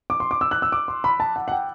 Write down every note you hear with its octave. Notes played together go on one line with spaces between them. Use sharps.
D6
C6
D6
E6
F#6
E6
D6
C6
B5
A5
F#5
F#5
G5